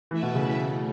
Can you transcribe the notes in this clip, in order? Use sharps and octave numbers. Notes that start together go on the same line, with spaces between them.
E3 A3 E4 B4 E5
B2
C#3
E3
C#3 A3